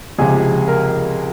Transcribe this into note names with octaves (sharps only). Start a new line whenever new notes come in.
C#2 C3 F3 G#4
A#4